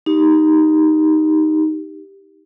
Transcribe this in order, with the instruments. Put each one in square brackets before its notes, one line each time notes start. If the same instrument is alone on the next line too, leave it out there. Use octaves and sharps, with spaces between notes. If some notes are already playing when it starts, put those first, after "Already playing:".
[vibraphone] D#4 G4